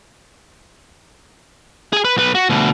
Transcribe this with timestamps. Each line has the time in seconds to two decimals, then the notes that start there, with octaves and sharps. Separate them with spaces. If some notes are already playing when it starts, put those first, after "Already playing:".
1.93 G#4 G#5
2.05 B4
2.16 B1 B4
2.35 F#4
2.49 D2 B2